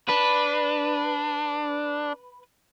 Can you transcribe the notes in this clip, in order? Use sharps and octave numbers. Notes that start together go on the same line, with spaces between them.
D4 B4